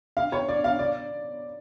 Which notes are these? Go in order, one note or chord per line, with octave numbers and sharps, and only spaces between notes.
F5
C#5
D5
F5
D5